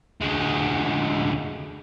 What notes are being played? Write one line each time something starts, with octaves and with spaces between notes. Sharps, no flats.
D2 G#3